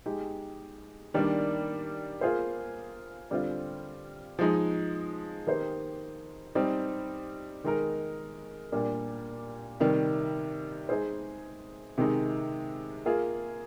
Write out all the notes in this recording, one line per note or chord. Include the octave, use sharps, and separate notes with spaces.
G#3 D#4 G4
D#3 G3 A#3 D4
A#3 F4 G#4 C5
D3 G3 C4 F4
F3 G#3 D#4
D#3 A#3 D#4 G4 C5
G3 C4 D#4
D#3 G#3 D#4 A#4
A#2 G3 A#3 D4
C3 D#3 G3
G#3 D#4 G#4 C5
C3 D#3 G#3 D#4
A#3 F4 G#4